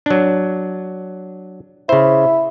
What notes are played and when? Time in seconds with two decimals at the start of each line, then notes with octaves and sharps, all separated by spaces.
0.06 F#3 D4
1.89 C#3 E4 C5